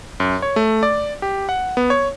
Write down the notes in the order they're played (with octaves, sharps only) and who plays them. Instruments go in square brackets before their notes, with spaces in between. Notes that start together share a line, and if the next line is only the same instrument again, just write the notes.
[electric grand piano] F#2
C#5
A3
D5
G4
F#5
B3
C#5